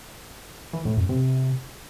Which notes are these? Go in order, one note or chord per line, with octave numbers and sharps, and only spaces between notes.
E3
A2
F#2
C3